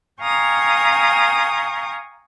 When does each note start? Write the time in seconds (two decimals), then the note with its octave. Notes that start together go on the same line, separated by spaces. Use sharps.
0.22 F5 G5 G#5 A#5 C#6 D#6